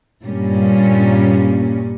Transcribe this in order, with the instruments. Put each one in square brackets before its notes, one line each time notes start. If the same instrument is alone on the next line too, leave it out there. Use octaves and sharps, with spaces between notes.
[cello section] G2 A#2 G3 A#3 C#4